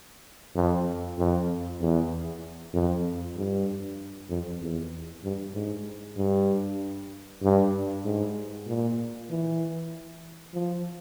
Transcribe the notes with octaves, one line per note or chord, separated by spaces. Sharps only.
F2
F2
E2
F2
G2
F2
E2
G2
G#2
G2
G2
G#2
A#2
E3
F3